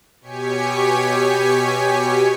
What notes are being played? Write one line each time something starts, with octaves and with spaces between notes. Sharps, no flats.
B2 G4 C#5 G#5 B6 C#7